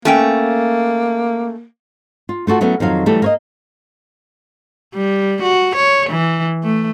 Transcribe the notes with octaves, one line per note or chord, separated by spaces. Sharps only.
A3 A#3 C#4 G5
F4
A3 F4 F#4 A4
F#3 A3 B3 C#4 E4
F2 D#3 F#3 F5
E3 F#3 G3 A3 G4 A4
A#3 C#5 D#5
G3
F#4
C#5
E3
A3